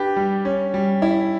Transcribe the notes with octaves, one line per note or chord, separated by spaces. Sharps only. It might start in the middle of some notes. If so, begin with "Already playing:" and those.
Already playing: D4 G4 B4
G3
C#4
G3
E4